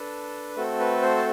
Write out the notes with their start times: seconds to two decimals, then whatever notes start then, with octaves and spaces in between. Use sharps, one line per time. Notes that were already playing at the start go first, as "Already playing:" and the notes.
Already playing: D4 A4 B4
0.56 A3 C4 F#4 A4
0.79 B4
1.02 C5
1.17 A5